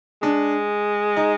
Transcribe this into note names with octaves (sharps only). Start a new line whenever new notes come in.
G#3 D4
D#4